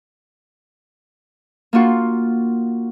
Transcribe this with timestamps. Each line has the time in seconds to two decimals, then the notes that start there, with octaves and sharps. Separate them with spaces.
1.73 A#3 D4 F4 F#4